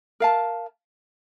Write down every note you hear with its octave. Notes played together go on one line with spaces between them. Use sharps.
A#4 F5 A5